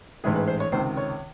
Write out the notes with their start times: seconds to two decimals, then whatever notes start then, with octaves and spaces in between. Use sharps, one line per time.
0.24 A1 G#2 E3 G#3 G#4
0.35 B4
0.48 C5
0.60 C#5
0.72 C#2 C3 D#3 C5
0.97 C#5